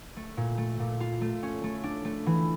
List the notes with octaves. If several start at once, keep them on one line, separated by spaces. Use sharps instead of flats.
A3
A#2
A3
A#2
F4
A3
C#4
A3
D4
A3
E3